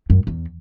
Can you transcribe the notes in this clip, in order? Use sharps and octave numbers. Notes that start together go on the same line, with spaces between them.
F#2
E2